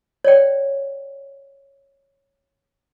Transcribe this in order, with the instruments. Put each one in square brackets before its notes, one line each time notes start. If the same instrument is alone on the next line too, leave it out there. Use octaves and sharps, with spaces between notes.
[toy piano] C#5 D5 G5